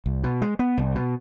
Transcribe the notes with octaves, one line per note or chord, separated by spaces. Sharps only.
C2
B2
G#3
B3
C2
B2